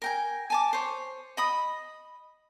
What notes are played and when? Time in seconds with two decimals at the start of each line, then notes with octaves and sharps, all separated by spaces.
0.02 A#4 G5 G#5
0.50 G#5 A5 D6
0.73 C5 C#5
1.37 D#5 B5 D#6